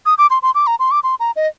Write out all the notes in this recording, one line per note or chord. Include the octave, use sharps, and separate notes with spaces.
D#6
D6
C6
C6
D6
A#5
C6
D6
C6
A#5
D#5